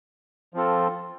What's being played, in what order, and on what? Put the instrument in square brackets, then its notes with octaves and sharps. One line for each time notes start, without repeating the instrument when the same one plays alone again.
[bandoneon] F3 C4 F4 A4